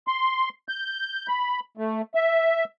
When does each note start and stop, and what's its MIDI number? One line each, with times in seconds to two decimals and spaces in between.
0.07 0.49 84
0.68 1.28 91
1.28 1.60 83
1.77 2.02 57
2.15 2.64 76